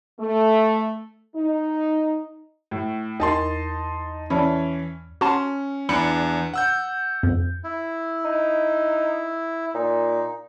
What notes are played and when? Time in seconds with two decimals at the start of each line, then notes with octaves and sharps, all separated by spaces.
0.20 A3
1.36 D#4
2.71 A2
3.20 E2 D#4 A#4 A5 C6
4.30 E3 C#4 D5 A5 B5
5.21 C#4 F#4 A5 C6
5.89 E2 D4 B5 C#7
6.54 F#5 E6 G6
7.23 F2
7.64 E4
8.25 D#4
9.74 A#2 D#4